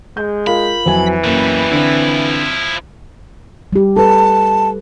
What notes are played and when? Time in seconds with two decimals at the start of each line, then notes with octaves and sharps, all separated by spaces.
0.17 G#3 G6
0.47 F4 A#4 F5 B5
0.86 F2 E3 F#3 G#5
1.24 F#2 B2 G3 A#3
1.72 D3 F3 C4 E4
3.73 G3 G4
3.96 A4 B4 A5